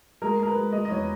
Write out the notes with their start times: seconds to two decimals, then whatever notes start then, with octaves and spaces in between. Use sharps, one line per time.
0.22 G#3 A#4
0.38 G#3 A#4
0.47 B4
0.56 G#3
0.72 G#3 D#5
0.85 D#5
0.90 E2 C#5